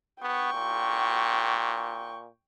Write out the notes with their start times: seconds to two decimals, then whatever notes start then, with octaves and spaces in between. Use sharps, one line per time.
0.22 B3 G5 C#6
0.54 A#2